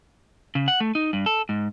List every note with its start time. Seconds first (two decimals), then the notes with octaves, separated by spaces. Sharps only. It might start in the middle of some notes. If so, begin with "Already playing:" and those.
0.55 C#3
0.68 F#5
0.80 A3
0.95 D#4
1.13 G2
1.26 A4
1.49 G#2